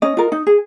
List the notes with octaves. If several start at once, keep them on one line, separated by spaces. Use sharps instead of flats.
C#4 D#5
F4 A#4
D#4
G#4